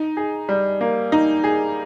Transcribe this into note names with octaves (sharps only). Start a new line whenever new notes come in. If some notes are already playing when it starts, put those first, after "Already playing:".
Already playing: D#4
G#4
G3
A#3
D#4
G#4